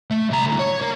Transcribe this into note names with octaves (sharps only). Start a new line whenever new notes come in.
A3
C2 A#5
D2 A2
C#5
A#3